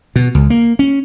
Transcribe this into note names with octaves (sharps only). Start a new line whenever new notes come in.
B2
C#2
A#3
C#4